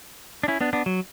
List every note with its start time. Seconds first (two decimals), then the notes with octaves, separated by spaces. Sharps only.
0.43 D4
0.48 C#4 E4
0.61 B3 D4
0.73 B3 D4
0.86 F#3